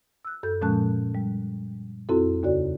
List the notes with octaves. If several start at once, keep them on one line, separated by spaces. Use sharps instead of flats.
E6 F#6
F#2 A4 G6
A#2 F3 G#3 C#4 A5 F#6
G3
F2 C4 E4 F#4 A4
D#2 C#3 F#4 D5